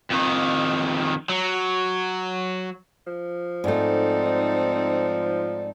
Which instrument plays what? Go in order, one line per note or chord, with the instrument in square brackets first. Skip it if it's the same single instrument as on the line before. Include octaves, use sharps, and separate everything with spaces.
[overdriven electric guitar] F2 D#3
F#3
[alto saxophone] F3
[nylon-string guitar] G#2 A3 [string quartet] C4 D#4 A4 [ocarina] D5